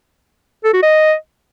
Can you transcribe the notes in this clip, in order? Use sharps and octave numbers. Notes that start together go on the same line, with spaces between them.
A4
F#4
D#5